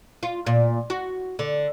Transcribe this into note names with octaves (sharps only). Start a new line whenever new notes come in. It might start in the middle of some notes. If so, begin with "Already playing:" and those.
F4
A#2
F#4
D3